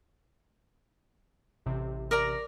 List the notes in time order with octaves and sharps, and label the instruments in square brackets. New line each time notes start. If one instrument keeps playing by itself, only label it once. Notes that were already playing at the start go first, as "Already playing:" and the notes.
[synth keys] A1 C3
[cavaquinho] A#4 D5 A#5